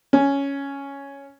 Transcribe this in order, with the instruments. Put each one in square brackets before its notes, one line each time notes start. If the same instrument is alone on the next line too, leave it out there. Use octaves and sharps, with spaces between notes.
[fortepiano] C#4